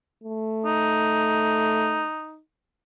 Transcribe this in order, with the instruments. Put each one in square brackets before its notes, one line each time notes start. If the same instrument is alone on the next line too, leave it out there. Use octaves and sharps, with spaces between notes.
[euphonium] A3
[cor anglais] D#4